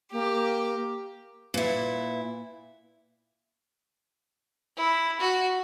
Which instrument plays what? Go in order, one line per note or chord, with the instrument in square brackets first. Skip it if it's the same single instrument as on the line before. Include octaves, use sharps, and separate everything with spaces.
[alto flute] A#3 [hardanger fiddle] G4
[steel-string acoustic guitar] A#2 E4 [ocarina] B4
[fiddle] E4
F#4